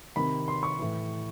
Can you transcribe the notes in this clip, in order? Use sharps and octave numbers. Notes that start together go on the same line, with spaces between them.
C3 D#3 B5
C6
C#6
A2 E3